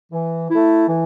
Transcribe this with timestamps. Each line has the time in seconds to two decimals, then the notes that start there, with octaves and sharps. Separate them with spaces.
0.12 E3
0.50 A3 E4
0.88 E3